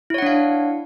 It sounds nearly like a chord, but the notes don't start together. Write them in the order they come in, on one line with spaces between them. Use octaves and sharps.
E4 C#5 F#5 D4 F5